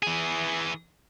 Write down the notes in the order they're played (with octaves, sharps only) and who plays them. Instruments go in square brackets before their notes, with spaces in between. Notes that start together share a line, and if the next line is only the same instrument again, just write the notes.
[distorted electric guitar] E3 G#4